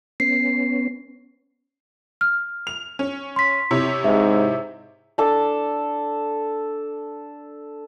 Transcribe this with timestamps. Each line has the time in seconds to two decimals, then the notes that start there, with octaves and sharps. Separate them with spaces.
0.20 B3 C#4 C7
2.21 F6
2.67 F7
2.99 C#4
3.36 C6 B6
3.71 C3 E4 C#5
4.04 G#2 E5
5.18 D4 A4 D6